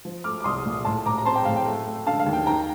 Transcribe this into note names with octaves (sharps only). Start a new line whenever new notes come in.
F3
A3 D6 F6
D6
C2 C6 D#6
A#2
A2 A5 C6
A2 A#5 D6
A#5
C4 A5 C6
G5
A2 F5
G5
A3
A3
D3 F5 A5
F5
D#2
G5
D#3 G5 A#5